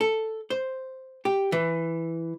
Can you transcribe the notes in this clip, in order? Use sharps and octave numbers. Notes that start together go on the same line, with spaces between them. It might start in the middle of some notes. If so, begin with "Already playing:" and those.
A4
C5
G4
E3